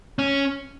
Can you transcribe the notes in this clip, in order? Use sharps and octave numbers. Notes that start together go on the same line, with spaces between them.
C#4